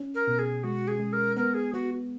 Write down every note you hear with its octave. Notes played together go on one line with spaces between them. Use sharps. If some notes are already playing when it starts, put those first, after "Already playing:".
Already playing: C#4
A#4
B2
G#4
G#3 F#4
G#4
G#3
A#4
B3 A#4
G#4
B3 F#4